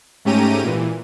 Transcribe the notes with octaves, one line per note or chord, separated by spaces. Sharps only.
G#2 A3 C#4 G4 A#5 D#7
A#2 E3